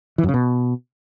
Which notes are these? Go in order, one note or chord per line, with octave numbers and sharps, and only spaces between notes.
E3
F#2
C#3
B2